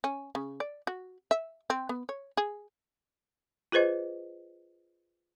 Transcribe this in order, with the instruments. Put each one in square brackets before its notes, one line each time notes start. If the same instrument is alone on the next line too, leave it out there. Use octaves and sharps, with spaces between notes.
[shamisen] C#4
C#3
D5
F#4
E5
C4
B3
C#5
G#4
[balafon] F4 G#4 B4 C5 D#5